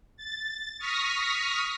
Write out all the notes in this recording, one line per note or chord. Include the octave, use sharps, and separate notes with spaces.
A6
C#6 D#6 F6 A#6 B6